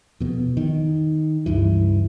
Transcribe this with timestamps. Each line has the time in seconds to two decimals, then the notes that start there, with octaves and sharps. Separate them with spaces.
0.20 F2 B2
0.57 D#3
1.46 C#2 G2 E3